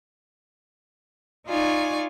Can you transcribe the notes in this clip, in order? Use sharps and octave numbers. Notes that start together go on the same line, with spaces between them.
D#4 F4 D5 G#5 C#6